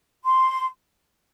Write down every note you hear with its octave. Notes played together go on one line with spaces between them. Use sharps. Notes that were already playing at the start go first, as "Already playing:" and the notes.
C6